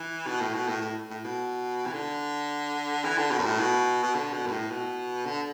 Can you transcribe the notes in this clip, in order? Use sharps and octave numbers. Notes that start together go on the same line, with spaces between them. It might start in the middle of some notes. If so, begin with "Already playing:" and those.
Already playing: E3
B2
A2
B2
A2
A2
A2
B2
E3
D3
E3
D3
B2
F#2
A2
B2
B2
D3
B2
F#2
A2
B2
D3